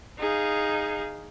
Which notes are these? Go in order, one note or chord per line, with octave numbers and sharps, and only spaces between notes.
D#4 G#4 F5